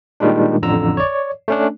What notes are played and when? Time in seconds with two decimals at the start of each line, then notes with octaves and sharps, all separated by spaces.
0.20 A#2 D#3 G3 G#3 D4
0.62 A1 F2 D3 A#5 E6
0.97 C#5 D5
1.48 A3 C#4 D4